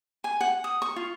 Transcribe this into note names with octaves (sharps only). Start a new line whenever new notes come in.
G#5
F#5
D#6
C#6
F4